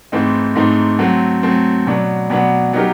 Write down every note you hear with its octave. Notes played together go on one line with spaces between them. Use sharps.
G#2 E3 A3 C4 D#4
G#2 E3 A3 C4 D#4
F#3 A3 C4
F#3 A3 C4
B2 F#3 B3 D4
B2 F#3 B3 D4
F#3 B3 D#4 G4 A#4